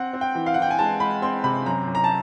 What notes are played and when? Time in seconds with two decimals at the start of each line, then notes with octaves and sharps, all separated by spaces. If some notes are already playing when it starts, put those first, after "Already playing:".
Already playing: C4 F#5
0.13 C4
0.21 G5
0.35 E3
0.46 F5
0.54 F#5
0.58 E3 G5
0.71 G#5
0.79 G#3 A5
1.00 G#3 B5
1.22 C4 C6
1.44 C3 B5
1.66 F#2 A#5
1.88 F#2
1.95 A#5
2.04 A5